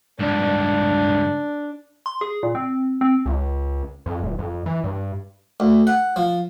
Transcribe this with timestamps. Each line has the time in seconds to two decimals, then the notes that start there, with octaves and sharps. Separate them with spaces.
0.19 C#2 G2 D4
2.06 C6
2.21 G#4
2.43 A#2
2.55 C4
3.01 C4
3.26 C#2
4.06 F2
4.23 D#1
4.39 F2
4.66 E3
4.84 G2
5.60 D2
5.87 F#5
6.16 F3